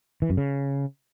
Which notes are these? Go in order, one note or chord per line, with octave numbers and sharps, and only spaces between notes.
E3
F#2
C#3